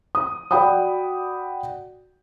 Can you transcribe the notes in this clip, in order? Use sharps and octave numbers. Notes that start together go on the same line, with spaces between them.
D#6
F#4 D5 F#5 G5 B5 D#6